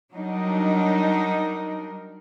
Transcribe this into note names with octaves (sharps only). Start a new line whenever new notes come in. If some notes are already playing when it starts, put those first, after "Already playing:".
F#3 G3 D4 D#4 A#4